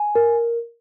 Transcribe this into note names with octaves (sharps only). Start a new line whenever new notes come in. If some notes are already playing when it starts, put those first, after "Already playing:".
Already playing: G#5
A#4